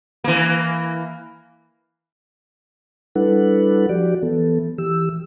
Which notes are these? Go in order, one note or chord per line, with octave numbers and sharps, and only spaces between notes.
E3 A#3
G3 D4 E4 A4 B4 F#5
F3 F#4 G4 D5
E3 B3 A4
E3 G4 E6